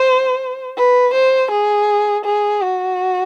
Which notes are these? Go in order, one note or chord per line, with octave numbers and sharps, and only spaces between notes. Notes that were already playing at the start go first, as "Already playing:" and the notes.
Already playing: C5
B4
C5
G#4
G#4
F#4